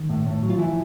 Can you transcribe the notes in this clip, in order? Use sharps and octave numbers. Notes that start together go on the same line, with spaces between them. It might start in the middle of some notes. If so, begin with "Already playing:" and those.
Already playing: D#3
A2
A2
F#3
F4
E3 F3 E4